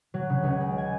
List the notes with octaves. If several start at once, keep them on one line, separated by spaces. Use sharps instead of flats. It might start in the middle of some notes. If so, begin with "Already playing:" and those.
F#3
C#3
C#2
G#3
G#5